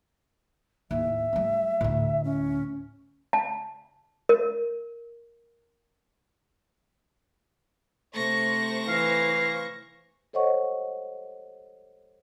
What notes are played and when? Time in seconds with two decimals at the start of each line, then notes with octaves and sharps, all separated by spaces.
0.91 D#2 A2 E5
1.33 G3 A3
1.81 D2 A2
2.24 C#4
3.33 A5
4.29 A#4
8.14 C3 A3 C5 C#6 A#6
8.88 E3 F5
10.33 A4 C5 C#5 D#5 F#5 C#6